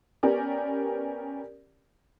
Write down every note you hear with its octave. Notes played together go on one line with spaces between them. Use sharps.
B3 C#4 G4 A#4 D5